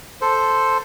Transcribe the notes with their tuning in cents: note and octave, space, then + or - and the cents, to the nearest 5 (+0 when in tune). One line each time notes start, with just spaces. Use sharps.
A4 +0 C5 +0